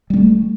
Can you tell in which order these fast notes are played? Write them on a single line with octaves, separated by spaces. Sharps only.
G3 B3 A3